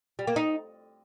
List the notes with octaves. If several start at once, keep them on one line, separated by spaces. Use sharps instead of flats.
G3
A#3
D#4